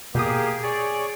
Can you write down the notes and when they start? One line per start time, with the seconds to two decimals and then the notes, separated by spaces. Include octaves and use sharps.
0.15 B2 A#3 G4 G#4 D#6
0.63 G#4 C#5 D5